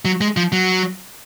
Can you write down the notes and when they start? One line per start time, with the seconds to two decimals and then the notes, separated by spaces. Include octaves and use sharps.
0.05 F#3
0.21 G#3
0.37 F3
0.52 F#3